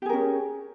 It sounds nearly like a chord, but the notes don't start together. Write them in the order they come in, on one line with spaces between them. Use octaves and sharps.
G4 G#4 A#4 C#4